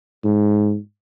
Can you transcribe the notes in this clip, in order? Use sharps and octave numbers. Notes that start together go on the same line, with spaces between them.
G#2